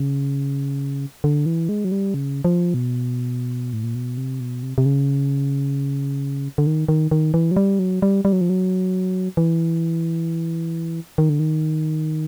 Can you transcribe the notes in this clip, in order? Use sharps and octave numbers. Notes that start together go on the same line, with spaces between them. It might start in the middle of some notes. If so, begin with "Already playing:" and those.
Already playing: C#3
D3
E3
G#3
F#3
G3
C#3
F3
B2
A2
A#2
B2
C3
B2
C3
C3
C#3
D3
D#3
D#3
D#3
E3
F#3
G3
F#3
G3
G3
F#3
F3
F#3
E3
D#3
D3
D#3